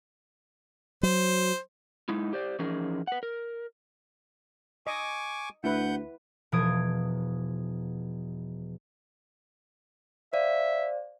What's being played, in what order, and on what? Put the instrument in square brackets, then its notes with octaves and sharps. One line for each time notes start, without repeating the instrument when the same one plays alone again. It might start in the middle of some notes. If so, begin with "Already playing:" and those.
[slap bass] F#3 [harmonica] C5
[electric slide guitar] G#3 D#4 E4
G4 C5 D5
E3 F3 C#4 D#4 G#4 A#4
B4 F#5
A#4
[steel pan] D#5 [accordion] G#5 C#6 D6
[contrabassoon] D2 [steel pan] E4 B4 [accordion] F#5 G6
[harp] E1 B2 F3 D#6 G#6 D7
[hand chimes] C5 D5 F5 [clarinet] E5